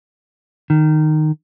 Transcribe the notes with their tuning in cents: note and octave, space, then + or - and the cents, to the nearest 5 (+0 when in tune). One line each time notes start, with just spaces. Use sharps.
D#3 -10